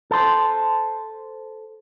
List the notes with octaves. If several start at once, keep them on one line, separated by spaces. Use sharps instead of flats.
A4 C5